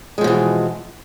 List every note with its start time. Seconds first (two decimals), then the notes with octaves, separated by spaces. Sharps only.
0.18 G#3
0.21 F3
0.24 B2
0.27 E3